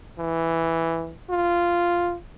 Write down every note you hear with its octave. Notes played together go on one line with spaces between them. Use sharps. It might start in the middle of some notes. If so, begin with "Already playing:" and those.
E3
F4